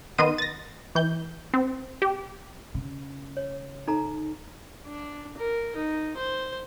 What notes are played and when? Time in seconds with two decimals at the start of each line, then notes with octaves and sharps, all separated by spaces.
0.18 D#3 B3 D#5 C6 D#7
0.38 A6 A#6
0.95 E3 G6
1.54 C4
2.02 G4
2.74 C#3
3.37 C#5
3.87 D#4 A4 A#5
4.86 D4
5.37 A#4
5.76 D#4
6.17 C5